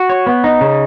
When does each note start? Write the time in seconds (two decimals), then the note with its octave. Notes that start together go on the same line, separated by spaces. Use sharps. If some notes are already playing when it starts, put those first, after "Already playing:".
Already playing: F#4
0.10 C#5
0.27 B3
0.44 D#4
0.61 C#3